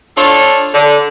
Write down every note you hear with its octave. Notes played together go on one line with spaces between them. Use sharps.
D4 F4 A4 C#5
D3